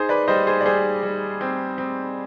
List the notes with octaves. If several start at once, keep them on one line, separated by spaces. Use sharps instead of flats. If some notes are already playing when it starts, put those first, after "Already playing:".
Already playing: D#4 G#4 C5
B4 D5
G3 C5 D#5
G#4 C5
D5
G3 G#4 C5
G3
C4
C4